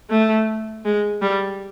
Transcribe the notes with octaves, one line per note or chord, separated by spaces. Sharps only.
A3
G#3
G3